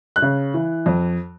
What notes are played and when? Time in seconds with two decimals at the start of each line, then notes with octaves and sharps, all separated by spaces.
0.16 F#6
0.22 C#3
0.54 E3
0.86 F2